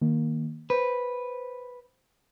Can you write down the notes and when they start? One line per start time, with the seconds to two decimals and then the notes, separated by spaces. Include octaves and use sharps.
0.01 D#3 A#3
0.70 B4 C5